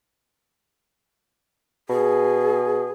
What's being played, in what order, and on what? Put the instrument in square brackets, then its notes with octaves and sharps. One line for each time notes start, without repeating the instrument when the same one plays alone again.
[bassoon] B2 [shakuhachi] G#4